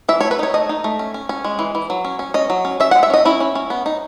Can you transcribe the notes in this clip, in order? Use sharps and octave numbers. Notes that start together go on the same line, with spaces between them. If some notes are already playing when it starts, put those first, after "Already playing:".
E3 E5
A3 C#5
B4
D#4 C#5
A3 D#5
D#4
A3
C#4
C#4
C#4
G#3
E3
E3
F#3
C#4
C#4
C#4 D#5
F#3
C#4
C#4 E5
G#3 F#5
E5
C#4 D#5
C#4 E4
C#4
C#4
B3
D#4